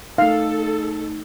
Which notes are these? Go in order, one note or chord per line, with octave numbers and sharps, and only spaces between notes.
A3 D#4 A4 F5